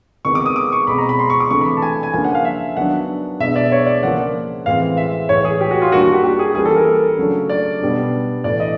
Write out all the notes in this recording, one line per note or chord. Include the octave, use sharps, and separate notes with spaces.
C3 D#3 G#3 B3 C#6
D6
D#6
D6
C#6
B2 G#3 C4 B5
A#5
B5
C6
C#6
D6
C3 E3 A3 D4 C#6
B5
A5
G#5
G#5
C#3 F3 A#3 D4 G#5
F#5
F5
E5
D#3 F#3 B3 D4 F#5
B2 G#3 B3 D4 E5
D5
C#5
D5
C#3 F3 A#3 F#5
A2 E3 G#3 C4 F5
E5
A2 E3 G#3 C#5
G#4
G4
F#4
F4
D#3 G3 A#3 D4 F#4
F#4
G4
G4
G#4
E3 G3 A#3 C#4 G#4
A4
A#4
C#3 F#3 A3 D4
D5
B2 G3 B3 D4
A2 E3 A3 D5
D#5